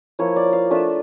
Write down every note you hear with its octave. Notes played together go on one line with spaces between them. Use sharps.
F3 A#3 E4 C#5
D5
F5
A3 D4 F4 E5